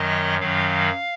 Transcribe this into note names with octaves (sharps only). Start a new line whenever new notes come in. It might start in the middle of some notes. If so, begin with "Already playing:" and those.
Already playing: F#2 D#3 F#3 D#5
F#2 D#3 F#3 F5